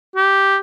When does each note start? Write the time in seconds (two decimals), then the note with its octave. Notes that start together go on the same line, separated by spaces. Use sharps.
0.16 G4